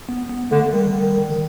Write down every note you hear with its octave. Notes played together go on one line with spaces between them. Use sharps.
B3
B3
D3 A3
D#3 G3
D#3
D#3